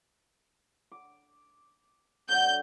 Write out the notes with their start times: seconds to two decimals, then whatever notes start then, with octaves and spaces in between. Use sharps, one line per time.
0.92 D6
2.29 D3 F#3 G6